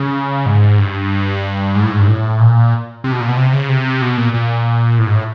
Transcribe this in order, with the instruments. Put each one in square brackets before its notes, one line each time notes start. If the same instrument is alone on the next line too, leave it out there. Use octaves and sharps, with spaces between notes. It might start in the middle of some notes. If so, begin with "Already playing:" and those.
Already playing: [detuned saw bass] C#3
G#2
G2
G#2
A2
G#2
G2
A2
A#2
C3
B2
A#2
B2
C3
C#3
C3
B2
A#2
A#2
A2
G#2
A2